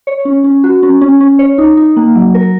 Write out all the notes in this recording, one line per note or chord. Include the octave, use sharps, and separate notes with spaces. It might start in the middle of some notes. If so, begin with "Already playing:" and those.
C#5
C#4
C#4
F#4
C#4
C#4
C#4
C#5
D#4
D#4
A#3
F#3
A#4